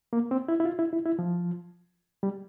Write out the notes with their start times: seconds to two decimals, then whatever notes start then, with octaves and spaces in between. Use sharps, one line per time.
0.13 A#3
0.31 C4
0.48 E4
0.60 E4
0.65 F4
0.79 E4
0.93 E4
1.06 E4
1.19 F3
2.23 G3